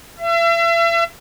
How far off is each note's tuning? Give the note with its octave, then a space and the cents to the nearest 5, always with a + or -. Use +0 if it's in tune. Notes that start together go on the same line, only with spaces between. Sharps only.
E5 +40